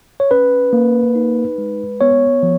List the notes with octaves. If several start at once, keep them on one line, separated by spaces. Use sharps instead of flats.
C#5
C#4 B4
A#3
D#4
G#3
B3 C#5
F3